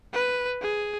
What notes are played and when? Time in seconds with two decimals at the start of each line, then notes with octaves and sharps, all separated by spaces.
0.13 B4
0.61 G#4